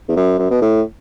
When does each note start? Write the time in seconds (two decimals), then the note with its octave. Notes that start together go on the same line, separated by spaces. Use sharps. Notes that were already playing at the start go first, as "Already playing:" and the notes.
0.09 E2
0.16 F#2
0.39 F#2
0.51 B2
0.62 A2